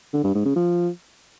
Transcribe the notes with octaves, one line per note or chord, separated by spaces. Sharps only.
D3
G2
G#2
C#3
F3